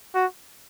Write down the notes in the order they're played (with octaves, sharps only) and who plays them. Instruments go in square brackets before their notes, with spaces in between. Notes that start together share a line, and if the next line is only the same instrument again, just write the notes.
[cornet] F#4